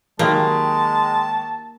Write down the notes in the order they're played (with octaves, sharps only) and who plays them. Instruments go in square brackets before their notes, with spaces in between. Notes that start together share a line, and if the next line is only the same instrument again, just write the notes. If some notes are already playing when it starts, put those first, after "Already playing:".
[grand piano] D#3 F#3 G4 [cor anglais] G#3 [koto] A#3 [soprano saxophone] A5